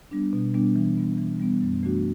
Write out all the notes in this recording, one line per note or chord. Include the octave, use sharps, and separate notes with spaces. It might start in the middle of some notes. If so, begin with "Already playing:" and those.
G3 B3 D4
B2
G3 B3 D4
E3
G3 B3
E3
G3 B3
F#2
E3 A3 D4 F#4